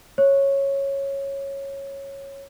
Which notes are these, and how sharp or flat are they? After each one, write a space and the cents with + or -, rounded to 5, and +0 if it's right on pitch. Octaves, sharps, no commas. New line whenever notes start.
C#5 -10